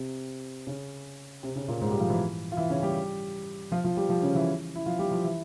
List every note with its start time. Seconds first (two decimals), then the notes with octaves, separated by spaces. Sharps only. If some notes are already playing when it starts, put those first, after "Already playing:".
Already playing: C3 C4
0.67 C#3 C#4
1.43 C3 C4
1.56 C#3 C#4
1.68 A#2 A#3
1.81 G#2 G#3
1.91 G3 G4
2.00 F3 F4
2.10 E3 E4
2.52 F4
2.57 E3 E4
2.70 C#3 C#4
2.83 G3 G4
3.72 F3 F4
3.84 F3 F4
3.97 G3 G4
4.09 F3 F4
4.22 C#3 C#4
4.35 E3 E4
4.76 E4
4.86 F3 F4
4.99 G3 G4
5.11 F3 F4
5.24 E3 E4